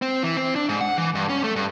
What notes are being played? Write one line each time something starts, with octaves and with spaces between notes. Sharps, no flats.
C4
E3
C4
D4
G#2
F#5
E3
G2
C#4
A3
G2